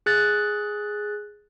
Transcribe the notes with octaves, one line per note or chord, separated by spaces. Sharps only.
G#4 F#6 A6